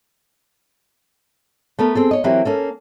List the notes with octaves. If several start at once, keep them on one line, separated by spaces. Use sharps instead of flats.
A3 B3 A4 A#4
C4 G#4 A4
C#5 D#5
E3 F#3 A#3 C4 E4 G4
A#3 C#4 A4